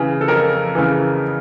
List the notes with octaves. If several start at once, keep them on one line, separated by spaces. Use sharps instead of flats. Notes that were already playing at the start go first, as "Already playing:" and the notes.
Already playing: C#3 E3 G#4
A4
F2 A#4
C#3 E3